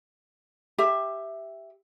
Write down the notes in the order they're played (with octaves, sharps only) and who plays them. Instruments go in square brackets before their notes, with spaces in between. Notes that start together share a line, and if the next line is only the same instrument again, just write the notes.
[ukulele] G4 E5